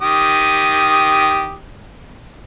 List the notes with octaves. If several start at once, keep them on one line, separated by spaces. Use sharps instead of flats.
D#3 G4 D#6